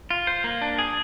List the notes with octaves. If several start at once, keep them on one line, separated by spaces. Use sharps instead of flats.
F4
C5
A#3
D4
G#4